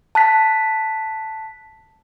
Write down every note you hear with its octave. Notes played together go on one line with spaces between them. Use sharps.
A5 F#6 B6